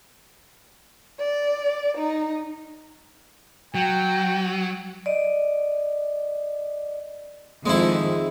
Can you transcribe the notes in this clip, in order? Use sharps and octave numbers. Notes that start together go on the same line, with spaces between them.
D5
D#4
F#3 G5
D5 D#5
F2 D#3 G#3 C4 E4